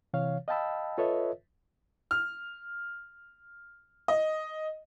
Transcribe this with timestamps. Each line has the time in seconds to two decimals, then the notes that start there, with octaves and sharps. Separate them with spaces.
0.13 C3 E3 C#5 F5
0.48 D#5 F5 G5 A5 B5 E6
0.98 F4 A4 B4 C#5 D#5 E5
2.11 F6
4.08 D#5